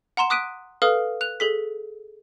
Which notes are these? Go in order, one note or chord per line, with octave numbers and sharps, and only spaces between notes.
F#5 A#5 C6 E7
D6 D#6 F#6 B6 D7 D#7
A4 B4 F5 D#6 F6
F#6 F7
G#4 A4 B6